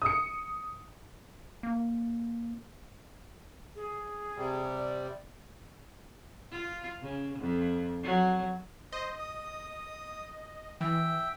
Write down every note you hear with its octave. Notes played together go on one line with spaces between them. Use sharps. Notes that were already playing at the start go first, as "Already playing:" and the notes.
D#6 C#7
A#3
G#4
C3 G3
D5
F4
C#3
F2
F#3
C5 D#5
D#6
E3 E5 G5